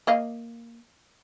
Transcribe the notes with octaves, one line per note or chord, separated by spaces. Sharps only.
A#3 D#5 F5